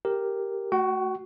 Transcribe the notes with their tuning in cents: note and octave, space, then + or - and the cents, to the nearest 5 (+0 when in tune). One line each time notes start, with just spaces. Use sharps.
G4 +0 A#4 +0
A3 +0 F#4 +5 G5 -45